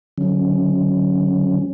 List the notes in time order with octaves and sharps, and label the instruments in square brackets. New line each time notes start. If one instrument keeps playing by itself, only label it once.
[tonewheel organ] D3 F#3 C#4